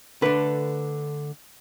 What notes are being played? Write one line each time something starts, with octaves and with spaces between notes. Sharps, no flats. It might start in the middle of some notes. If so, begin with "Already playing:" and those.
D3 A3 D4 B4